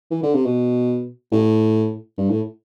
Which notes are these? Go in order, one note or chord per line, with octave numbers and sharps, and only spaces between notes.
E3
D3
C3
B2
A2
G2
A2